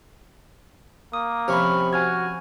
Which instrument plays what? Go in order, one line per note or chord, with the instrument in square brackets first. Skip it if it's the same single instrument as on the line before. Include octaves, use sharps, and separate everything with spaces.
[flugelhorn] A#3 [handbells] D#6
[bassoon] C3 [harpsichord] F3 C#4 [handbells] B5 C#6 F6
[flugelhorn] F#4 [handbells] G#5 F6 G#6